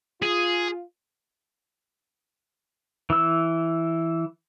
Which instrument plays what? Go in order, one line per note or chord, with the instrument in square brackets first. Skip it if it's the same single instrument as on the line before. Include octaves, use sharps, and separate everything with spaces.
[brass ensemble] F4 [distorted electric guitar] G#4
[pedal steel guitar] E3 E6